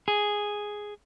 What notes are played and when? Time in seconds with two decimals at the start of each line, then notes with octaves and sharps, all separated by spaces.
0.08 G#4